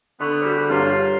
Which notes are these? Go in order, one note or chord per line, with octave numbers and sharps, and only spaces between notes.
D3 B3 C#6
G3 F#4 G#4 C5
G2 F4 G4 C#5 A#5 C7